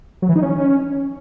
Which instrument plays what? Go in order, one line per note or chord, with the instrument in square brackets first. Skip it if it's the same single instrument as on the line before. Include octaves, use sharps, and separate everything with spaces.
[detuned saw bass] F#3
E3
D#4
C#4